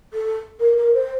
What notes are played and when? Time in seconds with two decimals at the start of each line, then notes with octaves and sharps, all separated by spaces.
0.13 A4
0.60 A#4
0.77 A#4
0.94 C5